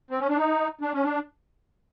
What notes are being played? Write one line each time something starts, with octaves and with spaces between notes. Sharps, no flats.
C4
C#4
D4
D#4
D4
C#4
D4